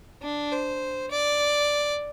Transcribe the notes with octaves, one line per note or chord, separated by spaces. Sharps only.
D4
C5
D5